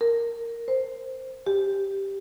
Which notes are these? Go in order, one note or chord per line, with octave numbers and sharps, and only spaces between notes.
A#4
C5
G4